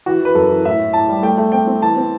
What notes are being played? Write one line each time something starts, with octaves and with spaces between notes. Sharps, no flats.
E3 F#4
E3 B4
F#2 A4
E3
A2 E5
A2
A2 A5
G3
A3 G5
A3
C4 G5
C4
E3 A5
C4